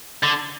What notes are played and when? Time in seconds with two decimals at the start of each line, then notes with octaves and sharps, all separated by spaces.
0.23 D3